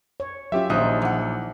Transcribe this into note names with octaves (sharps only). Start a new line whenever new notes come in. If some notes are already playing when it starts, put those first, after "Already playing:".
C#5
F#3 C#4 F4 G4 E5
A#1 D#3 D#4 F4 C5 D#5 E5
E3 F#5